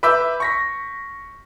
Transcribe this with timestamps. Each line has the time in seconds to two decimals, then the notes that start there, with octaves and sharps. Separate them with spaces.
0.03 B4 E5 D6 E6 G6
0.40 C#6 A#6 B6